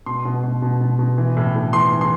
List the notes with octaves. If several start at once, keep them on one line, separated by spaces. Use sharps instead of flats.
B2 C6
B2
B2
B2
B2
B2
E3
A2
A2
E3 C6
E3
C6